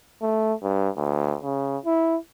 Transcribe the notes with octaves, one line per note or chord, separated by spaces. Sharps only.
A3
G2
D2
C#3
E4